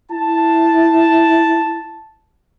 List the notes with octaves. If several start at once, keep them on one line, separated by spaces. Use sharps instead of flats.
E4 A5